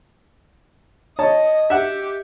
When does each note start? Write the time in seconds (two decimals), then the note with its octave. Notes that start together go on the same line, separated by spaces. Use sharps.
1.19 C#5 D#5 A5
1.70 G4 E5 F#5